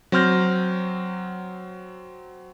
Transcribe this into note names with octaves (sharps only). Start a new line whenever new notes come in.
F#3 C4 C6 F6 G6 A#6